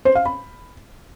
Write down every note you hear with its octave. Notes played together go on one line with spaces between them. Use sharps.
C5
F5
B5